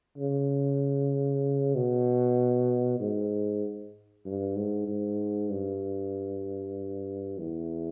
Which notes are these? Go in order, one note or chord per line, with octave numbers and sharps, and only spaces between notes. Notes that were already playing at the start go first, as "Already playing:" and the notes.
C#3
B2
G#2
G2
G#2
G#2
G2
E2